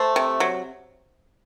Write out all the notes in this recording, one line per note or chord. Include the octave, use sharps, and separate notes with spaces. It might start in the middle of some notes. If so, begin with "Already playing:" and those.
Already playing: A3 C5
C3
F#3